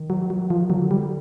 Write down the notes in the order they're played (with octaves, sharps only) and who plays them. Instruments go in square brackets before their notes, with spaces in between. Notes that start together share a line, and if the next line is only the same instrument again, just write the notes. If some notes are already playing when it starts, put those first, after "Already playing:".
Already playing: [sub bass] D#3
[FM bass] F#3
F#3
F3
[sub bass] D3 [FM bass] F#3
[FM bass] G3